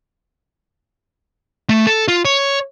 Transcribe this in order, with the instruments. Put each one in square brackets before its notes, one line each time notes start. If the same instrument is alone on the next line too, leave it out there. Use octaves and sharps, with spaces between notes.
[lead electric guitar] A3
A4
F4
C#5